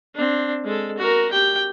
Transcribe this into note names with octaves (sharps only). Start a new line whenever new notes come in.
C4 D4
G#3 A4
F#4 A#4
G4 G5